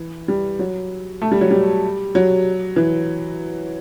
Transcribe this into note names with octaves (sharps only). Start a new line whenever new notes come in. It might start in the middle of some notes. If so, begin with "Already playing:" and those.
Already playing: E3
G3
F#3
A3
G3
F#3
G3
F#3
E3